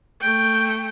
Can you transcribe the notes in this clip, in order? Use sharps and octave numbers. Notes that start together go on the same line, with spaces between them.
A3 G5